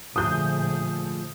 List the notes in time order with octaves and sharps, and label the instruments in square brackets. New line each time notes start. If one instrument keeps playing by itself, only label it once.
[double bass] A#1 D3 [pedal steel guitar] F3 A3 G#4 [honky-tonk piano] D#6 G6